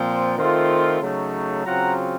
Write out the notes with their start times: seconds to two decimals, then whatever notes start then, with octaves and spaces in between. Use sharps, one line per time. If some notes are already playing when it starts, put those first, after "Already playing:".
Already playing: A#2 F3 C4 C5
0.38 D#3 A3 C4 F4
1.01 C#3 F#3 A3 D#4
1.64 C#3 F#3 C4 F4 F#5 A#5